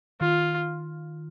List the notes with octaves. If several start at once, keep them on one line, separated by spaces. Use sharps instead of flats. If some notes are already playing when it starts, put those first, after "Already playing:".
D#3 F4